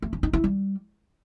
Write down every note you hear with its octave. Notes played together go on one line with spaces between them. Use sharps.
A3
C#4
D#4
E4
G3